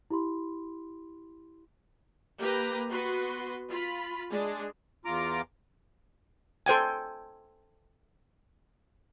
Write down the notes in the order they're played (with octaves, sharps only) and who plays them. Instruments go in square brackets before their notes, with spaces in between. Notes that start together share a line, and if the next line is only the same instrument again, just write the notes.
[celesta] E4 G4 B5 C6
[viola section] A#3 G4 B4 A#5
B3 F#4 B4 C6
F4 B5
G#3 D4
[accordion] E2 F4 A#5 D6
[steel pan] A4 C5 G5 G#5